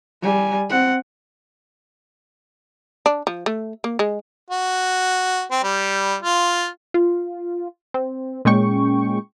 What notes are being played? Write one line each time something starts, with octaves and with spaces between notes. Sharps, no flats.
G3 G#5
C4 F#5
D4
F3
A3
A#3
G#3
F#4
C4
G3
F4
F4
C4
A#2 G#3 C#4 G5 C#6